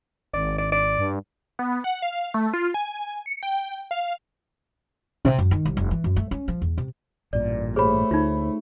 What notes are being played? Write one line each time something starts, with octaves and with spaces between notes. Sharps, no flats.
G#1 D5
D5
D5
G2
B3
F#5
F5
A3
F4
G#5
C#7
G5
F5
C3
F#2
D#3
C2
F1
E3
F#2
A3
C#4
F3
E2
C3
A1 G2 A#2 D5
A3 G4 G#4 C5 C#5 B5
D2 D#4 F4